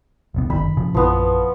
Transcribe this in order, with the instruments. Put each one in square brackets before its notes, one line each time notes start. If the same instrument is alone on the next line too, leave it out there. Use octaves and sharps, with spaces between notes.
[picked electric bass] E1 C2 B3
[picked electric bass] G1 F#2 D#3 [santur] B5
[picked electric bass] A#2 C#3 F3
[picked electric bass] A#1 F#2 [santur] F3 B3